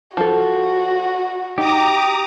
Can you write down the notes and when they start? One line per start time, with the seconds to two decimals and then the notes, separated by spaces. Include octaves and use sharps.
0.17 F3 F#4 A4
1.58 D#4 G4 A#5 D6 D#6